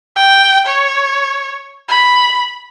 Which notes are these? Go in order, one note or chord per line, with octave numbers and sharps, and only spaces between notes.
G5
C#5
B5